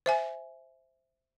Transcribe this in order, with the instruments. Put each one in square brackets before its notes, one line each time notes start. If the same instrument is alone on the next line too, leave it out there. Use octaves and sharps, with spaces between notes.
[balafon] C5 E5 G#5